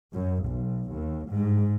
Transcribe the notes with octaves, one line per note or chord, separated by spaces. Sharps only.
F#2
B1
D#2
G#2